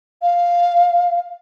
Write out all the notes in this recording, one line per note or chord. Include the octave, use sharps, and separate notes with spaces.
F5